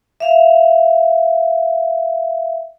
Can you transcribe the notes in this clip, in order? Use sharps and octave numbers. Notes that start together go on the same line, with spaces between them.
E5 F5